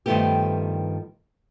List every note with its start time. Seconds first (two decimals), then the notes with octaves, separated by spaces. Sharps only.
0.06 G2 D#3 F3 A3 B3 G4